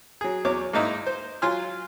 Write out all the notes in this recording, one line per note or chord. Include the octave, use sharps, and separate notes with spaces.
F#3 G#4
E2 F#3 C#5 D6
G#2 A#3 D#4 E4
C5
F#3 F4 G#5 C6 F6